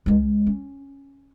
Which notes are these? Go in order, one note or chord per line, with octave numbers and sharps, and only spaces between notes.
C#2 G#3
C#4